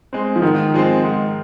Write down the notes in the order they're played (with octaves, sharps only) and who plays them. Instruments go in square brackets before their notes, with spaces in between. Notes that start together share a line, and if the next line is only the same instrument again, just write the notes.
[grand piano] G#3 C4
[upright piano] F3
[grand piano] G#2 [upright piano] D#3
[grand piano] F3 G#3 C4
G#2